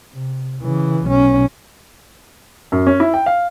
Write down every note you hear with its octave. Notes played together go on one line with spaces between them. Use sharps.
C3
C#3 E3
B1 C#4
F#2
C#4
E4
G5
F5